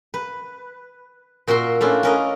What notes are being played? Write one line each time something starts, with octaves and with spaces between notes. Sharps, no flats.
B4
A#2 F#4 A#4 E5 C6
A3 C#4 D4 E4 F4
C#4 A#4 D#5